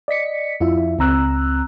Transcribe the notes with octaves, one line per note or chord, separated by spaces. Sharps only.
D5 D#5 B6 C#7
F2 E4 F4 E5
C#2 C4 A#5 E6 F#6